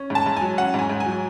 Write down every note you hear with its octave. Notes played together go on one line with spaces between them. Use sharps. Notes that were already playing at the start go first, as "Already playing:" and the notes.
Already playing: C#4
G#2 A5
G#2
F#3 G#5
C#4 F#5
G#2 G#5
G#2
G#5
F#3